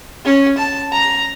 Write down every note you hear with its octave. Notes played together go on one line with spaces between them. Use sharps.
C#4
A5
A#5